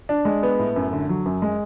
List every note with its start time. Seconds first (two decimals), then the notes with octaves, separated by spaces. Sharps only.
0.09 D4
0.25 G#3
0.43 B3
0.59 A2
0.76 F#2
0.93 D3
1.09 F#3
1.26 F#2
1.42 G#3